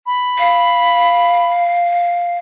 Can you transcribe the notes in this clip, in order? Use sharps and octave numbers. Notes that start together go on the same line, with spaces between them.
B5
F5